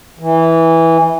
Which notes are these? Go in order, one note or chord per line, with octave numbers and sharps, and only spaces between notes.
E3